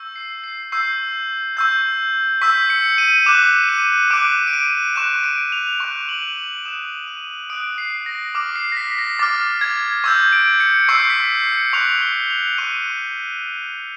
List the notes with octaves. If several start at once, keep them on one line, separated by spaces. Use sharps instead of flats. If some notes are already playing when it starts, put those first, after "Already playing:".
Already playing: C#6 E6 G6
C7
C7
C#6 E6 G6 C7
C#6 E6 G6
C#6 E6 G6 B6
C#7
D#7
D6 F#6 E7
D#7
D6 F#6 D7
D7
D#7
C#6 F#6 E7
D7
F7
C#6 F#6 F7
F#7
F#7
D#6 F#6 E7
D#7
D#6 F#6 D7
C7
A#6
D6 F6
C7
A#6
B6
A#6
D6 F6 A6
G#6
C#6 E6 G6 G#6
D7
C#7
C#6 E6 G6 C7
B6
C7
C#7
C#6 F#6 F7
G7
F7
C#6 F#6 D#7